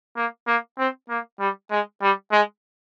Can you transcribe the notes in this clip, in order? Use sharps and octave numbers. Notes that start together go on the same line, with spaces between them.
A#3
A#3
C4
A#3
G3
G#3
G3
G#3